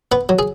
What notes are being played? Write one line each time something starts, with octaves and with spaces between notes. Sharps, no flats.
B3 B4
F#3
G#4